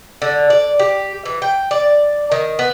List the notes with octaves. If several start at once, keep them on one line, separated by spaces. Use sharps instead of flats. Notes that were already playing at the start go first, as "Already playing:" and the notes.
D3
D5
G4
E3
G5
D5
D#3
B3